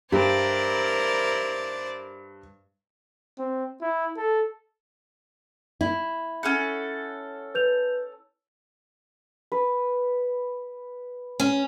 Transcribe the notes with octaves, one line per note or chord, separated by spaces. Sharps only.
G2 E4 G4 A#4 C5 D5
C4
E4
A4
E4
C#4 A4 F#5
B4 G6 F7
B4
C#4